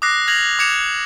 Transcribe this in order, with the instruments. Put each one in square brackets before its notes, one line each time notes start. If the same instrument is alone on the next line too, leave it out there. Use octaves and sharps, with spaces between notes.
[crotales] D6 D#6 F#6 A#6 C7
F6 G#6 A#6 F7 F#7
D6 G#6 C#7 E7 F7